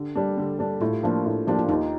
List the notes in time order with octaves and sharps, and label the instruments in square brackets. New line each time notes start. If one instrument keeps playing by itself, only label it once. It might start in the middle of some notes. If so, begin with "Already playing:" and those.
Already playing: [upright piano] D3 [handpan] G4
[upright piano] G3 D4
D3
G3 D4
[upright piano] A2 [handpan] F4
[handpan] G4
[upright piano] F3 A#3 D4 [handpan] F4
[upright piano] A2
[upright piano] F3 A#3 D4 [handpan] G4
[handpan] F4
[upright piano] D#2 [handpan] D#4